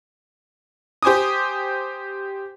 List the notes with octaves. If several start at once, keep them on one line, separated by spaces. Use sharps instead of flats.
G4 C5 G#5 D6 D#6